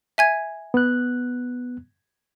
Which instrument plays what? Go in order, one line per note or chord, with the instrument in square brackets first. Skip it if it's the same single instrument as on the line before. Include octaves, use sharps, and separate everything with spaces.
[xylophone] E5 G#5 G#6
[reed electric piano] B3 F#6